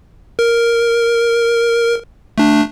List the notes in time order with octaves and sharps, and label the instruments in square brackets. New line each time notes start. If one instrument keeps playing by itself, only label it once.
[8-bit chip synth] A#4
A3 D4